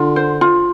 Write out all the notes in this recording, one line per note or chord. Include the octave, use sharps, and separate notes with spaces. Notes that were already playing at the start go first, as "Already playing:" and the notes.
Already playing: D3 F4
C5
F4